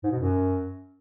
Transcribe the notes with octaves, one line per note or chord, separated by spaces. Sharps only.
G#2
B2
F#2